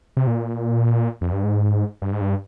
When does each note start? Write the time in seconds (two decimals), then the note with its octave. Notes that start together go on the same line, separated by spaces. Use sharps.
0.17 C3
0.27 A#2
1.21 F2
1.32 G2
1.44 G#2
2.02 G2
2.13 G#2
2.21 G2